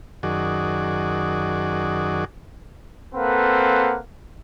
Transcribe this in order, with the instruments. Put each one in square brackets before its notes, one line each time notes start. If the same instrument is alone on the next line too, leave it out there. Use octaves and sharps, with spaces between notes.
[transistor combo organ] F#2 D#3 F#4 G#4 D5
[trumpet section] A#3 C4 A4 B4 F5 F#5